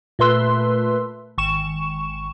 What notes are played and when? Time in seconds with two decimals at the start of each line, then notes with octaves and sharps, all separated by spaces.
0.19 A#2 A3 B4 C6 E6
1.38 G#1 C#6 E7